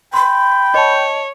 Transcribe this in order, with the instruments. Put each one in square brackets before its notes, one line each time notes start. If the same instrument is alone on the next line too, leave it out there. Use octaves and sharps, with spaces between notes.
[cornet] G5 [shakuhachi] B5 [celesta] C6
[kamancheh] C#5 [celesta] D#5 A5